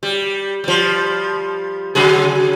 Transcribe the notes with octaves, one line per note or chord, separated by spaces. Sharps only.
G3
F3 G3
C#3 F#3 G#4